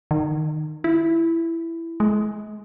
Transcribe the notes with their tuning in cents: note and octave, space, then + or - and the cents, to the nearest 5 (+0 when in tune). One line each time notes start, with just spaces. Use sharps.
D#3 -20
E4 +10
G#3 +35